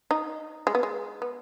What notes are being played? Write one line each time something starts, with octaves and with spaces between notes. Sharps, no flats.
D#4
G#3
B3
G#3
B3